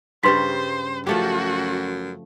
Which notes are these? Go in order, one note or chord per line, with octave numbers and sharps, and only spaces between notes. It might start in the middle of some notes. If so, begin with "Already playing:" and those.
G2 C#3 G3 B4 C5 C6 B6
F#2 F3 A3 F#4 G4